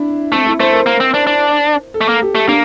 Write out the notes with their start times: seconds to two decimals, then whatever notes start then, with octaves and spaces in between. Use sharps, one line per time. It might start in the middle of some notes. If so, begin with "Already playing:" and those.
Already playing: D4 E4
0.32 A3 C4
0.47 E4
0.60 A3 C5
0.73 A#4
0.86 A#3
1.00 C4
1.14 D4
1.27 D4
1.94 A4
2.01 A3
2.09 A#3
2.22 G4
2.35 A3
2.48 A#3 D4